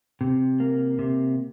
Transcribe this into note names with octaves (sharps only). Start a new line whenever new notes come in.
C3
A#3
C3